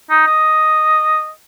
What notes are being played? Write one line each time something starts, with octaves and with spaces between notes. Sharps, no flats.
D#4
D#5